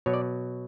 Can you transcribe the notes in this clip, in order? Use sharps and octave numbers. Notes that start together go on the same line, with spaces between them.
B2 F#3 C#5
D5